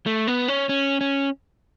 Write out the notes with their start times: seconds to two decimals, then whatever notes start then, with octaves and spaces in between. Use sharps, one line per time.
0.06 A3
0.27 B3
0.48 C#4
0.69 C#4
1.01 C#4